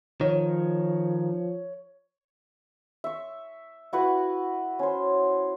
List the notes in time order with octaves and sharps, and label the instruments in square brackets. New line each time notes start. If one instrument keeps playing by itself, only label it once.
[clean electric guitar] D#3 [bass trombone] F3 [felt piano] C#5
[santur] E5 C#6
E4 F#4 B4 F#5
C#4 C5